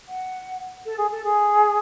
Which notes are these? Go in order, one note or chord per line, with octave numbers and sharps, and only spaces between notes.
F#5
A4
G#4
A4
G#4